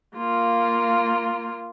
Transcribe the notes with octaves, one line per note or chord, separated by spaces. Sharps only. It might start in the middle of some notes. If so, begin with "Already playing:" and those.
A#3 F4